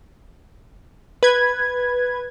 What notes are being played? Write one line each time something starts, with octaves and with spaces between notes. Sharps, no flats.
B4 G#6